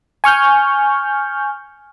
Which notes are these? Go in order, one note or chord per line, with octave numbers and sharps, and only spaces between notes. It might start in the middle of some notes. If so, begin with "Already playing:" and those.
G#5 C#6 F6 G6